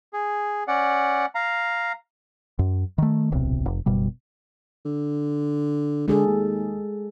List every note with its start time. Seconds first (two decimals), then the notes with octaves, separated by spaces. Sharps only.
0.13 G#4
0.68 C#4 D5 F#5
1.35 F5 A#5
2.59 F#2
2.98 D#3 A3
3.32 D1 B1 C3
3.66 F1
3.86 F#1 B2 G3
4.85 D3
6.08 D3 G#3 G#4 A4
6.27 D#2